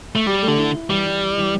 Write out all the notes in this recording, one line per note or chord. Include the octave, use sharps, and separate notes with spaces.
A3
G3 G4
A3
D3
E4
E4
E3 G3
E3
E4
E3